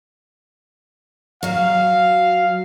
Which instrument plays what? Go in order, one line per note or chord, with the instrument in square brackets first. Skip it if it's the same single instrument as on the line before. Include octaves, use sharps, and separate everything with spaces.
[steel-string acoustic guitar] F#3 F#4 [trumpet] F5